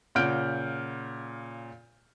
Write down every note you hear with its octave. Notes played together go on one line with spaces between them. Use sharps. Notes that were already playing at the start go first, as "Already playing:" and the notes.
A#2 C#3 F#5 F6 G6 D7